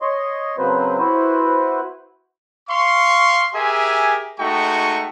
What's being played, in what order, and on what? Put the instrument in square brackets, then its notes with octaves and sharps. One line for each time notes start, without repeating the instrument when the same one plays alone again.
[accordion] C#5 D#5 C6
C#3 F#3 A#3 C4 B4 C5
E4 F#4 B4 C5
[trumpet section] F5 C6 C#6
G4 G#4 A#4 E5 G#5
G#3 A3 D#4 F#4 G5 C#6